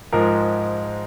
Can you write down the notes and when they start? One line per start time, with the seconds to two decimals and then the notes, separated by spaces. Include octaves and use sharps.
0.13 G#2 F3 G#3 A#4